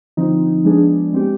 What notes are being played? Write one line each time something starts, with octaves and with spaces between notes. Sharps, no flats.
D3 F3 C4 D#4
F3 G#3 B3 D4 G#4
G#3 C4 G4